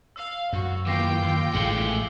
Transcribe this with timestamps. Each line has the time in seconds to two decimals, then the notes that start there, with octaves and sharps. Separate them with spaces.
0.16 F5 E6
0.53 F#2 F#4
0.86 D#2 E3 F4 G5 D6 A#6 C7
1.23 D#2
1.55 A1 G#2 E3 A3 G#4 C#7 F#7 G7